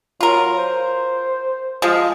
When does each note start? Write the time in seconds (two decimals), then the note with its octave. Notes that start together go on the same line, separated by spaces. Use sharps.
0.21 F#3 F4 A#4
0.58 C5
1.82 F3 G#3